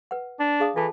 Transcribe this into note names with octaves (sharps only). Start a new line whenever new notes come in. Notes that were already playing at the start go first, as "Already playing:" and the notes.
B4 F#5
D4
G#4 F5 D#6
E3 F4 A4 A5